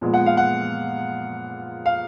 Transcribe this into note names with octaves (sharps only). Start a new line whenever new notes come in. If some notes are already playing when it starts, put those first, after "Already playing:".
A#2 F3 G#3 B3
F#5
F5
F#5
F5